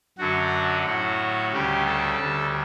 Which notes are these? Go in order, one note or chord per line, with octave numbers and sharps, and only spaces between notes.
F#2 D3 F#3 F#4
A2 F#3 F#4
D2 C#3 G3 G4
A4
D2 D3 G3